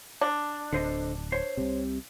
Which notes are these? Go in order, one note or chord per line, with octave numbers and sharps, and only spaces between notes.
D4
D1 D3 C5 D#5
C5 C#5
C2 C3